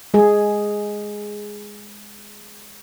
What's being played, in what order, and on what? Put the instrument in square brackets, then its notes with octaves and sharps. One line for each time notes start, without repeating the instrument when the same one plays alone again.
[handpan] G#3 G#4